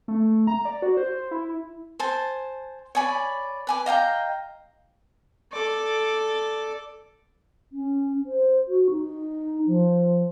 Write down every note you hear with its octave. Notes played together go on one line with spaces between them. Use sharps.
A3
A#5
D5
F#4
C5
E4
C5 G#5 A5
C#5 D5 G#5 B5
B4 G#5 D6
D#5 F5 G5 A#5
A4 D5
C#4
C5
F#4
D#4
F3